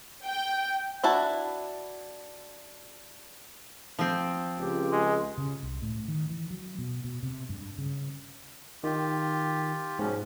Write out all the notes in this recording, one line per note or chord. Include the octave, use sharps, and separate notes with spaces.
G5
D4 E4 F#4 A5
F3 C4
C#2 G4
G#3
C#3
C2
A2
D#3
E3
F#3
B2
B2
C3
G2
C#3
D#3 F4 G4
G#2 B2 F3 C#4